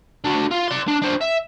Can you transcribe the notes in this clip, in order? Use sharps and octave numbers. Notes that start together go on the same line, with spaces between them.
D4 F#4
F4
D5 C6
D4
D4 C5
E5